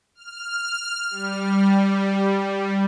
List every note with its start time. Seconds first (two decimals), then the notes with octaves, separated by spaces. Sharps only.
0.15 F6
1.10 G3